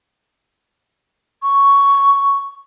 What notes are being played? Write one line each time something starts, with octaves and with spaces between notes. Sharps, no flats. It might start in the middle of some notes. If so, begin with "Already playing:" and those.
C#6